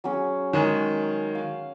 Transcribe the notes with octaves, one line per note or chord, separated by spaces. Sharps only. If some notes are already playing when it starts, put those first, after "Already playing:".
F#3 C#4 G#4
D#3 G#3 C#4 G#5
F5